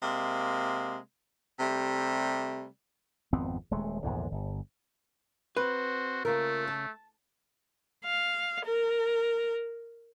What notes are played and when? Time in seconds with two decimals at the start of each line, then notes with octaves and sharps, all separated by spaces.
0.03 C3 G#3 A#3
1.60 C3 G3 A3
3.33 G#1 F2 B3 C4
3.71 D#1 G#3 A3
4.03 A#1 E2 G#2 D3
4.32 G1
5.57 C4 F#4 B4 C5
6.25 C#3 A3 A#3 F4 A#4
6.68 A5
8.05 F5
8.65 A#4